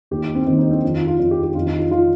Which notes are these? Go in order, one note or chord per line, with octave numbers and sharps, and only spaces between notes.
D#2 D#3 G4
C4
D#2 D#3 C4
D#4
C4
F2 D#3
F4
F4
F2 D#3
G4
G4
F2 D#3 F4
D#4
F4
D#3 F4